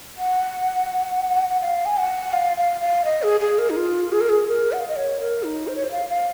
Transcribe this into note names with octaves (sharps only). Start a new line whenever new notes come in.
F#5
F#5
F5
G#5
F#5
F5
F5
F5
D#5
G#4
G#4
A#4
D#4
F4
G#4
A#4
G#4
A#4
F#5
F5
D#5
C#5
A#4
D#4
C5
C#5
C5
F5
F5